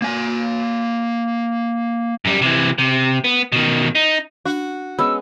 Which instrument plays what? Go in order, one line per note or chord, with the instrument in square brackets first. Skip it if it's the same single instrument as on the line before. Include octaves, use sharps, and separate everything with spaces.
[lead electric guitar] A#3 G#5
[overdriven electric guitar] F#2 G3
C3 E3
C3
B3
B2 D#3
D#4
[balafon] D4 [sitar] F#4
[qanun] G#3 B3 C#4 [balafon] B5 [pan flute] E6